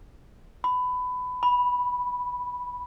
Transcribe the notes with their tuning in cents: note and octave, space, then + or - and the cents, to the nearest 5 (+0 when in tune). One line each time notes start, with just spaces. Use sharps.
B5 +20
B5 -5